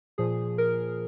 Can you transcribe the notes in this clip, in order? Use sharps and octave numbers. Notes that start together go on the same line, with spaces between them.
A#2 F3 G#4
A#4